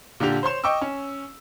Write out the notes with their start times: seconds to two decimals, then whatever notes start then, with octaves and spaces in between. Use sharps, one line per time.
0.20 A#2 D3 D4 G4 F7
0.43 C5 C#5 C6 E7
0.64 D#5 G5 C#6 D6 E6
0.82 C#4